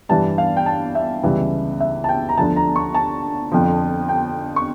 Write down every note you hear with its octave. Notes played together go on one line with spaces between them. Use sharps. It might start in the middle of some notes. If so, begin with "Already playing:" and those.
G2 E3 G3 A5
F5
G5
A5
E5
C#2 C#3 E3 G3
E5
A5
G5
A#5
D2 D3 F3 A5
A#5
C#6
A5
F2 D3 F3
G5
C#6